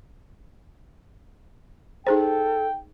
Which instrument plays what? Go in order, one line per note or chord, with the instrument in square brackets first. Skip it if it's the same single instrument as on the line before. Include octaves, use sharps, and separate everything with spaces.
[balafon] D#4 G#4 C5 [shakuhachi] A4 [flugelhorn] G5